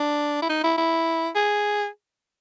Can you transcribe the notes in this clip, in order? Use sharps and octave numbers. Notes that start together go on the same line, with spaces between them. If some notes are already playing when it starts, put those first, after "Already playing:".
Already playing: D4
E4
D#4
E4
E4
G#4